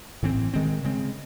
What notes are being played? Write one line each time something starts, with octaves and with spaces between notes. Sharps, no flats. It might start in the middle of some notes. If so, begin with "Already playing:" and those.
A2 E3 C4
D#3 G#3 C4
C#3 G#3 C4